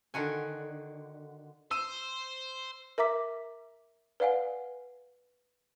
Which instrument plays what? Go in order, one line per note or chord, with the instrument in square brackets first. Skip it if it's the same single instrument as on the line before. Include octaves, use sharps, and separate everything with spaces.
[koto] D3 D#3 F#4 G#5
[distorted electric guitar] C5 [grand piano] E6 D#7
[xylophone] A#4 E5 A#5 D6 B6
B4 D5 F5 F#5 G#5